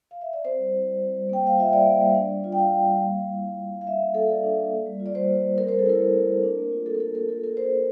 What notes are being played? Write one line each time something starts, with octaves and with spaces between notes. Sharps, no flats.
F5
E5
D5
C4 C5
G3
E4
G3
C4
G3
A#3 G5
G3 F5
F4 E5
G3 D5
A#3
G3
D4
G3
F4
G5
G3 F5
D4
G3
A#3
G3
E4
G3
A#3
G3
F5
D4 E5
A#3
F4 A4
A#3 D5
D4
A#3
A#3
G3
F4
D5
G3 C5
A#3
G3
C4 A#4
A3 C5
A4
E4 A#4
A3
C4
A3
D4
A#3
F4
A#3 A4
A#4
D4 A4
A#3 A#4
F4 A4
F4 A#4
A#3 C5
A#3